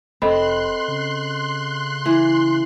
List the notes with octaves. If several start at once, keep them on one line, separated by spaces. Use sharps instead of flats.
F1 C4 A4 D#5 B5 C6 F#6
C#3
E3